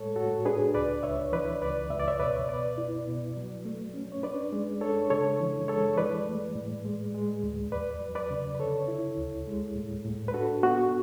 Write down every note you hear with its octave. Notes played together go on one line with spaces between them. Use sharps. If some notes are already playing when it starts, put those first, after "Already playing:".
Already playing: A2 G#3 A4 C#5
A2 F#4 A4
D4 G#4 B4
C#2 B4 D5
C#2 C#5 E5
E3 B4 D5
C#2 B4 D5
C#2 E5
D5
C#5 E5
B2 B4 D5
B2 B4 D5
E4
B2
F#3
A3
C#4
C#5
D4 B4 D5
G#3
D4 A4 C#5
C#3 A4 C#5
E3
G#3 A4 C#5
E3 B4 D5
A3
A2
G#3
G#3
D2
E2 B4 D5
F#3
B4 D5
C#3
B4
D3 A4 C#5
E4
D2
G#3
A2
A2
B4
D4 F#4 A4
B3 F#4